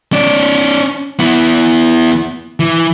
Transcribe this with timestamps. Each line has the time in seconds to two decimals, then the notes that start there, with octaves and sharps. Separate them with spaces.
0.13 C#4 D5
1.19 B3 E4
2.60 E3